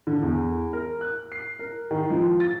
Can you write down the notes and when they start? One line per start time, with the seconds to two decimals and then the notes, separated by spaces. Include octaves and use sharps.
0.07 D3
0.23 E2
0.73 A#4
1.01 F#6
1.32 C7
1.59 A#4
1.91 D#3
2.10 F3
2.40 A6